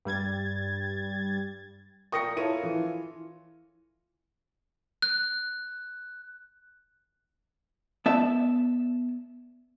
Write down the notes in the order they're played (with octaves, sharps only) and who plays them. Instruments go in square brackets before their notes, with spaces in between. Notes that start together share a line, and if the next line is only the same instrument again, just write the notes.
[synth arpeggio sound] G2 G3 G#6 A6
[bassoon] A#2 [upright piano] A#4 G5 C#6 [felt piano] D#6 A#6 C#7
[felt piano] E4 A#4 D#7 [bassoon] F4 [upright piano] A4 C#5 E5
[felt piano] E3
[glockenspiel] F#6
[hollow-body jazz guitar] B3 D5 E5 A5